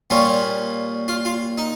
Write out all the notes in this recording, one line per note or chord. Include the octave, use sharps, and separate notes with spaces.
A#2 G3 C#4 F4
F4
F4
D#4